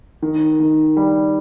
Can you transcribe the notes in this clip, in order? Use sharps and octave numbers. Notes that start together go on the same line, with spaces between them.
D#3
D#3
G3